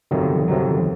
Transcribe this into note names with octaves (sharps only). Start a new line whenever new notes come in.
G1 F2 C3 D#3 F#3
G1 F2 C3 D#3 F#3